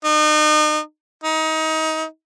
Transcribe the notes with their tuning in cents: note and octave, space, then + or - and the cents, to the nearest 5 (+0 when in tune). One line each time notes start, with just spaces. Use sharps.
D#4 -35
D#4 +25